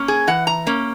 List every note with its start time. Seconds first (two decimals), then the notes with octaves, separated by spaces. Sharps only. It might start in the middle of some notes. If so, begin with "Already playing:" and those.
Already playing: A#3 C#4
0.08 G#4
0.27 E3 F#5
0.47 A#5
0.67 A#3 C#4